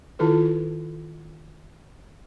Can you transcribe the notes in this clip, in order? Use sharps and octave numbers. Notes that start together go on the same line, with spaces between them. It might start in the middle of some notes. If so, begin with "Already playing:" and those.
D#3 E4 F4 A4 B4